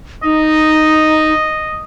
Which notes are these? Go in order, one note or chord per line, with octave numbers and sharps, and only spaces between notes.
D#4 D#5